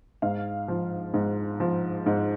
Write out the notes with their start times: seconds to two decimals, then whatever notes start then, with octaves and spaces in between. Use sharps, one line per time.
0.22 G#2 F5
0.68 F3
1.14 G#2
1.60 F3
2.06 G#2